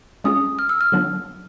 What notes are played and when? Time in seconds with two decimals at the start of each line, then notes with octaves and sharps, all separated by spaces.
0.24 G#3 C#4 F4 G#4 D#6
0.59 F6
0.69 E6
0.81 F6
0.92 D3 F#3 B3 D4 F4